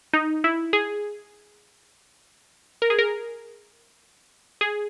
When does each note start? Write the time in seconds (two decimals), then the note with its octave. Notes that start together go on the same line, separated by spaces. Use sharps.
0.13 D#4
0.44 E4
0.73 G#4
2.82 A#4
2.90 G#4
2.99 A#4
4.61 G#4